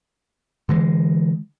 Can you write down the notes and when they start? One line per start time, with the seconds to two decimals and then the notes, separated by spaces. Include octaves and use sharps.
0.69 D3 E3 G#3